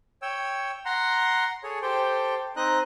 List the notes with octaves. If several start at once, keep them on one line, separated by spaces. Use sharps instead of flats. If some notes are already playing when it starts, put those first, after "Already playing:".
C#5 G5 E6
F#5 A#5 C6
G#4 A4 C#5
G4 A4 C5 G5
C4 D#4 D#5 F#6